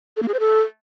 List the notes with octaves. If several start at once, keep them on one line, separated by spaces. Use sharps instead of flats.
A4
A#3
G#4
C5
A4